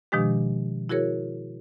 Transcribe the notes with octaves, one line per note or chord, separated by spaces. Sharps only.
B2 D#3 F3 G#3 D4 G4
E4 F#4 G#4 A#4 C#5